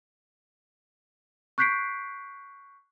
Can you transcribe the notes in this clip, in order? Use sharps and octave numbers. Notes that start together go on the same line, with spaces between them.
C#6 F#6 G6 B6 C7 D7